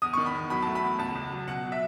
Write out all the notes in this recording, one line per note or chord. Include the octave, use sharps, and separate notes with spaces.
E2 D#6
D#3 C#6
B5
E2
F#3 B5
A3 A5
B5
E2
C#2 A5
C#2
F#3
B2 F#5
F#3
E5